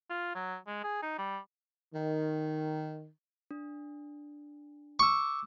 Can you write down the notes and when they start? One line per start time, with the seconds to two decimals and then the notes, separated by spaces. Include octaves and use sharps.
0.10 F4
0.35 F#3
0.67 G#3
0.84 G#4
1.03 D#4
1.19 G3
1.94 D#3
3.51 D4
4.99 C#6 D6 E6